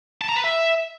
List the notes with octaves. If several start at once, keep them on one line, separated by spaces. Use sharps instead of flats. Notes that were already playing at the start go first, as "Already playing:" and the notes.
A5
A#5
B4
E5